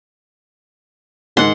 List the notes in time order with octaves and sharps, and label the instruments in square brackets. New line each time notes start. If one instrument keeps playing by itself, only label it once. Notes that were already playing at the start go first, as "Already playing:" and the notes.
[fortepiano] G#2 D#3 [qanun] F#5 C6